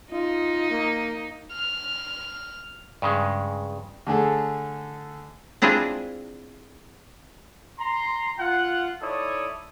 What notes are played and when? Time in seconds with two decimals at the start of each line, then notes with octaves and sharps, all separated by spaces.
0.12 D#4 F4
0.71 A#3
1.53 F6
3.02 G2 C#3 G#3
4.07 D3 A3 G#4 A4
5.62 C4 D4 E4 F4 G#4
7.79 A#5 C6
8.39 F4 F#5
9.02 D#4 E4 A4 C#5 D5 D#6